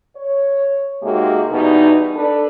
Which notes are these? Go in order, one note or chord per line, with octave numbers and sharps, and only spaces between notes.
C#5
C3 G#3 A#3 D#4 F#4 G4
E2 B2 G3 D#4
D4 A4 B4